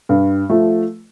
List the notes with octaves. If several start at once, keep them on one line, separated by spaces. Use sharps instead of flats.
G2
F3 A3